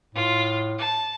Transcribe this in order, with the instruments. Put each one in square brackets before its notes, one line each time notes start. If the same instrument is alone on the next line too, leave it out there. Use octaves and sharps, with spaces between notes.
[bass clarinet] A2 [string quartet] F4
[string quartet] A5